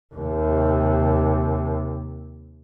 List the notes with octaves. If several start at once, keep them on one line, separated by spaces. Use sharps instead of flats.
D#2 C3